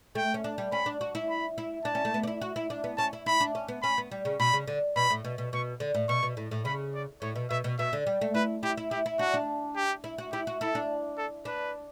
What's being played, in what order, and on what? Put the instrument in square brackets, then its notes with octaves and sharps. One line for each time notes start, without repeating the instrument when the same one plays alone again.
[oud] A3 [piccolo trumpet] G5
[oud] C#4
D4
G3
[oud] C#4 [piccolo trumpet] B5
[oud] D4
F#4
E4
[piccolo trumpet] B5
[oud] E4
[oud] D4 [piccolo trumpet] A5
[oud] C#4
A3
B3
D4
E4
F#4
E4
D4
B3
[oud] C#4 [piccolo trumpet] A5
[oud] E4
[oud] E4 [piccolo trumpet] B5
[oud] D4
C#4
B3
[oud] C#4 [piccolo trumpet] B5
[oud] B3
G3
C#3
[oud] B2 [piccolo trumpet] B5
[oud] C#3
D3
[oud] B2 [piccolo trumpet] B5
[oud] A2
B2
B2
[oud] B2 [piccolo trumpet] C#6
[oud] D3
A2
[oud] B2 [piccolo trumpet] C#6
[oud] B2
A2
A2
[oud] C#3 [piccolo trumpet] B5
[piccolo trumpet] D5
[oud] A2 [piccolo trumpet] C#5
[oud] B2
[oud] B2 [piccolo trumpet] E5
[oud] B2
[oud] B2 [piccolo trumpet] E5
[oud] D3
G3
A3
[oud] E4 [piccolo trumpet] B4
[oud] E4 [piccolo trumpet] G4
[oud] E4
[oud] E4 [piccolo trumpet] G4
[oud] E4
[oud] D4 [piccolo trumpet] F#4
[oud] D4
[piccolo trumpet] G4
[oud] E4
F#4
[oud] E4 [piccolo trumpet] G4
[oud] F#4
[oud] E4 [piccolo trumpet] A4
[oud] D4
[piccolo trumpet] A4
[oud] D4 [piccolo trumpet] B4